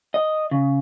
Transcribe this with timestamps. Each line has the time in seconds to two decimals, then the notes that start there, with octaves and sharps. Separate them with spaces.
0.14 D#5
0.51 C#3